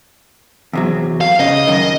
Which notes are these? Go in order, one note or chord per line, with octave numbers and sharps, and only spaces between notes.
E2 C3 F#3
F5
C#3 D#5
F#2 D#3